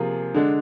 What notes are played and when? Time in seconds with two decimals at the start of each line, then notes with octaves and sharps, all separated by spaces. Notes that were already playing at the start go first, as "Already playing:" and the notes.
Already playing: C3 F3 A#3 F4 G#4
0.35 D3 G#3 D4